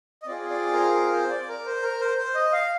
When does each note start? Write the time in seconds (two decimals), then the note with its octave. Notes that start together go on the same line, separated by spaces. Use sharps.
0.22 D#5
0.27 C4 F4 G#4 D5
0.50 D5
0.73 A#4
0.96 A#4
1.13 C5
1.30 D5
1.48 A#4
1.66 C5
1.83 A#4
2.00 C5
2.17 C5
2.35 D#5
2.52 F5